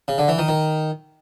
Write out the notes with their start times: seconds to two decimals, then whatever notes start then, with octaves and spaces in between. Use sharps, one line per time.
0.08 C#3
0.18 D3
0.28 E3
0.38 D#3
0.48 D#3